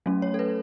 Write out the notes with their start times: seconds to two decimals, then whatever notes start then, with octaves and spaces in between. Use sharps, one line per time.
0.06 F#3 A3 C#4
0.22 C#5
0.34 A4
0.39 B4